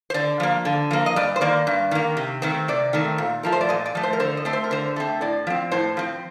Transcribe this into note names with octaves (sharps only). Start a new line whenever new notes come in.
C5
D3 D5
F3 A#3
D3
F3 A#3
D#5
G2 D5
C5
D#3 A#3 D5
G2
D#3 A#3
C3
D#3 A3 C4
C3 D5
D#3 A3 C4
A#2
F3 A3 A#4
C5
D5
A#2 D#5
D5
F3 A3
C5
A#4
D3 C5
D#5
A3 C4
C5
A#4
D3 C5
A3 C4
A2 D5
F3 C4
A2 C5
F3 C4